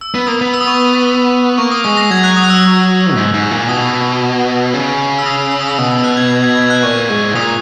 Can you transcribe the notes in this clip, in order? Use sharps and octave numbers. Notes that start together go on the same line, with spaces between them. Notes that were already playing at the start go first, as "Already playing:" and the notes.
E6
B3
A#3 D#6
B3
E6
D#6
C#6
D#6
A#3 C#6
D#6
G#3 D#6
A#6
F#3 G#6
F#6
D#6
F#6
E6
G#2
G#2
A#2
B2 D#6
C#3
E6
D#6
E6
D#6
E6
B2 D#6
E6
F#6
G#6
G#6
G#6
G#6
F#6
A#2 C#6
G#2
A#2 D#6